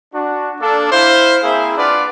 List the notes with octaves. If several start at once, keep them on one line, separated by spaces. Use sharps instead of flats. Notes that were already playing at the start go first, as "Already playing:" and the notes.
D4 F#4
A#3 D4 A4
E4 C5 F5
A#3 C4 E4 G#4 E5
D4 F4 B4 D5 F5 F#5